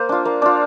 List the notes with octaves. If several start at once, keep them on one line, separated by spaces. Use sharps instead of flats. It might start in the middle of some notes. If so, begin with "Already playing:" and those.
Already playing: A#3 C5
D4 F4
A#3
D4 F4 D5